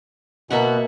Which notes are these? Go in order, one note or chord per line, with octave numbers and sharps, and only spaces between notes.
B2 A#3 E5 F#5